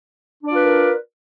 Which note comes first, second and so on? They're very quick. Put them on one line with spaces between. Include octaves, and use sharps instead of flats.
D4 D5 F4 B4 A#4